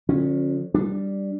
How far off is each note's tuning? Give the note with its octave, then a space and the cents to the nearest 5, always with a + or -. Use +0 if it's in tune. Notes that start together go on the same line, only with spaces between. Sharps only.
D3 +0 F3 +30 C#4 -20
G3 +0 D4 +0